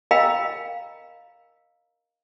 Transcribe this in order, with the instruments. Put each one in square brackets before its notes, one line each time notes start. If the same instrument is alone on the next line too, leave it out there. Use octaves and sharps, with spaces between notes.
[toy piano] A#4 D#5 F5 G5 A#5 B5